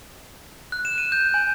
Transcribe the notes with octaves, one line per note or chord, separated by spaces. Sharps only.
F#6
E7
D#7
G6
G#5